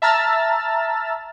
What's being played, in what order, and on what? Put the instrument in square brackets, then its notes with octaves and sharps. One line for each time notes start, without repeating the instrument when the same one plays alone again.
[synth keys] E5 A5 A#5 E6 F6 A6